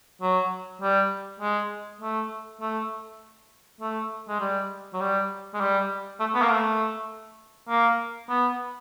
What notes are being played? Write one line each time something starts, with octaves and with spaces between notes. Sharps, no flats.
F#3
G3
G#3
A3
A3
A3
G#3
G3
F#3
G3
G#3
G3
A3
B3
A#3
A3
A#3
B3